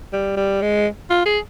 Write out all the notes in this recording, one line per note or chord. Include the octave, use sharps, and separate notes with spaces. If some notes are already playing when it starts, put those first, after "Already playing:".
G3
G3
G#3
F4
G#4